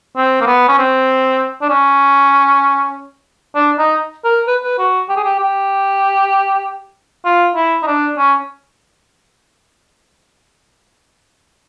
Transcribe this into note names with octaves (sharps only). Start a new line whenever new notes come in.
C4
A#3
B3
C#4
C4
D4
C#4
D4
D#4
A#4
B4
B4
F#4
G4
G#4
G4
G4
F4
E4
D#4
D4
C#4